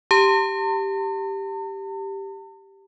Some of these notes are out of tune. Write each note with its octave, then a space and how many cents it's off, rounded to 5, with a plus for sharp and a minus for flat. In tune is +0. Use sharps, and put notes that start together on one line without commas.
G4 +0 A5 +45